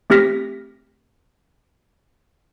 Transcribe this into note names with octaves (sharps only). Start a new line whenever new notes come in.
A3 C4 G4 F6 A#6 B6